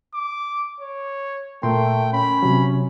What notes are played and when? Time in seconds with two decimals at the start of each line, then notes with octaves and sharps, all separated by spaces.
0.14 D6
0.80 C#5
1.63 A#2 A3 A#4 G5 C6
2.13 C#4 B5
2.43 C3 F#3